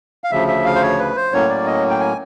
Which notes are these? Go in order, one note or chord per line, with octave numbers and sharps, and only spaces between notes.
F5
D2 C#3 F3 E5
E5
F5
C5
C#5
B4
C5
A2 F#3 A#3 C#4 C#5
D5
D#5
G5
G#5